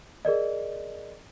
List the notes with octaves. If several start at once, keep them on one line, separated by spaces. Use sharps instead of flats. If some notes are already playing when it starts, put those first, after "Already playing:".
G#4 A#4 D5 D#5